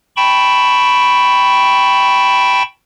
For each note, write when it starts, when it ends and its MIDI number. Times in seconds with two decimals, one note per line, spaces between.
0.16 2.63 79
0.16 2.63 81
0.16 2.63 83
0.16 2.63 85